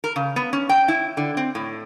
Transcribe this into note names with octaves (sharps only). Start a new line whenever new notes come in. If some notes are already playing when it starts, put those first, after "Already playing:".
A#4
C#3
B3
C#4
G5
E4
D3
C4
A2